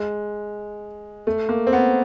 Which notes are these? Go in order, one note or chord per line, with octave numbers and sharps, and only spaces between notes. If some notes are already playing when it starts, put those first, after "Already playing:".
Already playing: G#3
A3
A#3
C4
B3